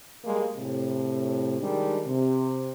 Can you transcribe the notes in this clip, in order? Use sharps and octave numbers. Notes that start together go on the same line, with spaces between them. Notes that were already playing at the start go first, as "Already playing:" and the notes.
G3 G#3 A#3
A2 C3
D#3 G3 G#3 D4
C3